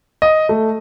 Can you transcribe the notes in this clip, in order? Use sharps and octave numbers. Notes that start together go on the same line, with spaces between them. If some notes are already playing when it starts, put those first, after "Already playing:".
D#5
A3